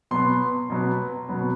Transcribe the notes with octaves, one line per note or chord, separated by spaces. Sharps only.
B2 F#3 B3 C6
B2 F#3 B3
B2 F#3 B3